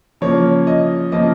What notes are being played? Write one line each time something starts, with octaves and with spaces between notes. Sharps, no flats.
C#3 F3 A#3 C#5
D#5
C#3 F3 A#3 D#5